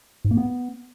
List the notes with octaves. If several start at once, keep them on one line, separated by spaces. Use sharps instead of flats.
G#2
A#3
B3